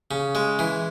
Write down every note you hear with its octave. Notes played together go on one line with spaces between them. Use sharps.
C#3
G#3
E3